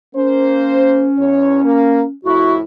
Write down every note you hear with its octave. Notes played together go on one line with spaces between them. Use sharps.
A#3 C#4 C5
E2 C#5
A#3
F2 A2 E4 F#4